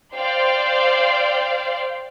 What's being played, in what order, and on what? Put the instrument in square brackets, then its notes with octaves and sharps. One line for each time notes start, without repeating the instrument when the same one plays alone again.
[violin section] C5 D5 F5 G5 C6